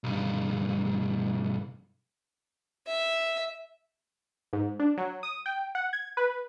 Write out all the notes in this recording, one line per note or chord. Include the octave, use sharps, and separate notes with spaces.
B1 G2
E5
G#2
D4
F#3
D#6
G5
F#5
G#6
B4